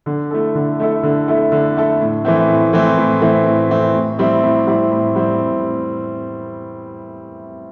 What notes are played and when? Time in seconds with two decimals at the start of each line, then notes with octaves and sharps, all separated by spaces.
0.06 D3
0.31 A3 E4 A4
0.55 D3
0.80 A3 E4 A4
1.03 D3
1.28 A3 E4 A4
1.52 D3
1.77 A3 E4 A4
2.00 A2
2.25 E3 A3 C4
2.48 A2
2.73 E3 A3 C4
2.98 A2
3.21 E3 A3 C4
3.46 A2
3.70 E3 A3 C4
3.94 A2
4.19 G3 C4 E4
4.43 A2
4.67 G3 C4 E4
4.91 A2
5.15 G3 C4 E4
5.40 A2